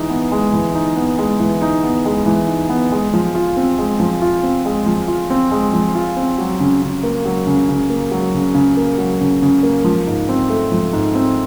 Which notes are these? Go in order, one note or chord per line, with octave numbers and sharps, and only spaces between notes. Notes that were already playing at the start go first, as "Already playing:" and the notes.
Already playing: E3 G#3 D#4
B3
G#3
E3
D#4
B3
G#3
E3
D#4
B3
G#3
E3
D#4
B3
G#3
F3
F4
C4
G#3
F3
F4
C4
G#3
F3
F4
C4
G#3
F3
F4
C4
F#3
C#3
C#3
A#3
F#3
C#3
C#3
A#3
F#3
C#3
C#3
A#3
F#3
C#3
C#3
A#3
F3
G#2
C4
A3
F3
G#2
C4